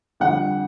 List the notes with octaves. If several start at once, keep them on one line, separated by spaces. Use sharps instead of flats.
F2 D3 G3 F#5